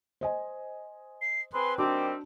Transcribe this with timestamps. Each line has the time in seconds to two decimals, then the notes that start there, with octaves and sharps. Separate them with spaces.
0.21 C5 D#5 G#5
1.22 C7
1.53 C4 G#4 B4 C6
1.78 D#3 G3 C4 D4 F#4 D6